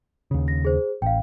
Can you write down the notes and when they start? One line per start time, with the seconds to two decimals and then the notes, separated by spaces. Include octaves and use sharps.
0.31 D#2 C#3
0.48 A#6
0.65 G#4 C5
1.02 A1 F5 G5